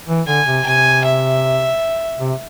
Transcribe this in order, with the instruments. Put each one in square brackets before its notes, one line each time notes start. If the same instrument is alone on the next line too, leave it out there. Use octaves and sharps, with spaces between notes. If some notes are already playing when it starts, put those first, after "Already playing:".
[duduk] E3
[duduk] D3 [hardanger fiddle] G#5
[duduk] C3
[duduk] C3 [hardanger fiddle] G#5
[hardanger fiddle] E5
[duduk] C3